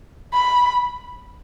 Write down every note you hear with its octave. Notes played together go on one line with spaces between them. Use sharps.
B5